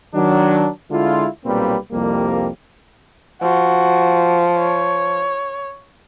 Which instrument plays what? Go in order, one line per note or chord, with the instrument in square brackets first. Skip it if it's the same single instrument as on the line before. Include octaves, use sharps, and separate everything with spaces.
[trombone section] D#3 F#3 D4
D3 G#3 E4 F4
B1 A#2 G3 A#3 C4 B4
C2 F2 G3 A#3
[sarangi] F3 [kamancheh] F#4
[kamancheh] C#5